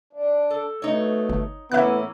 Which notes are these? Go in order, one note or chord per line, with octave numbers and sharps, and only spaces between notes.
D4
A4
B2 A3 D#4 C#5
G1
A2 E3 A#3 B3 C#4 E4 E5 F#6